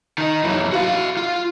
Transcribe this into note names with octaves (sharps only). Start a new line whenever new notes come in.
D#3 D#4
F#2 E3
F#4 F5
F4